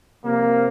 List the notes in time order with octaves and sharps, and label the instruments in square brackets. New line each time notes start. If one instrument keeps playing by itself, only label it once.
[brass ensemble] C3 F3 A#3